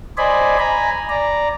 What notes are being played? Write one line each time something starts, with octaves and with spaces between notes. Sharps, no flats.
C5 D5 D#5 G#5 B5
G#5 A#5 B5
D5 A#5